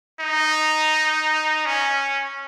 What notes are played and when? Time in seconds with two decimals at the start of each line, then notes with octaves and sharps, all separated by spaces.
0.20 D#4
1.66 C#4